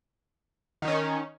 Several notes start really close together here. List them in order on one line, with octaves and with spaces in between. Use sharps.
D#3 D#4 C#4